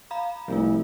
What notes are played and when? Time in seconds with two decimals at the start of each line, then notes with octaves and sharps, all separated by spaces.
0.11 F5 A#5 B5
0.48 C2 F3 A3 F4